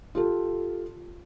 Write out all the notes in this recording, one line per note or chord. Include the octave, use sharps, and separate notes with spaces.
F4 G4 A4